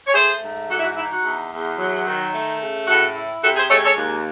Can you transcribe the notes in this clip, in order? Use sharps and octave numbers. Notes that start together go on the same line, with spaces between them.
C#5
A3 G#4 C5
G#2
E3 F#4 A4
E4
F#4
D#4 E4
F#4
E2
E2
F#3
D#3
A3
C#3
A2 F#4 A4
E4
C3 F#4 A4
G#4 C5
G#3 A4 C#5
A4 C#5
D#2